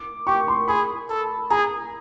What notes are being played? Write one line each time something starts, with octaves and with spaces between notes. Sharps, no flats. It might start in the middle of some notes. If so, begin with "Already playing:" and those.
Already playing: D6
G4 C#6
C6
G#4 B5
A4
G#4 A#5